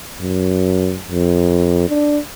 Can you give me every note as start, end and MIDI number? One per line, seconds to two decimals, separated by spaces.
0.22 0.98 42
1.08 1.85 41
1.89 2.18 62